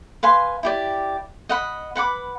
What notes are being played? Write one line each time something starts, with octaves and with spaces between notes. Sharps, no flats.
B4 F5 G#5 C6
E4 G4 D5
D#5 F#5 B5
B4 F#5 B5 D6